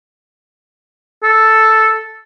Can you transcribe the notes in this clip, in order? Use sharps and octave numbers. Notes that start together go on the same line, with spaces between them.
A4